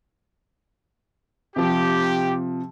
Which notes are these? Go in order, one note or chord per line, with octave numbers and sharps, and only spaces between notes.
C3 F3 G4